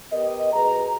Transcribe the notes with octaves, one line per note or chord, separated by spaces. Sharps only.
B3 G4 A#4 D#5
F#2 G#4 B4 A#5